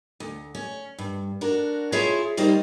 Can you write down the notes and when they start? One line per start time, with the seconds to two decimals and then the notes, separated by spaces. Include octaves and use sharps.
0.20 D2
0.55 C#4
0.99 G2
1.41 D4 F#4 A#4
1.92 E4 F4 G#4 C5 C#5 E5
2.37 D#3 G3 A#3 D#4 C5